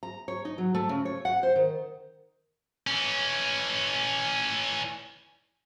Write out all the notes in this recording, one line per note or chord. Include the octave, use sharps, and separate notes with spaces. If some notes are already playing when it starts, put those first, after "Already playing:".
A#5
C#5
D#4
F#3
A3
C#3
C#5
F#5
C5
D#3
E3 C#4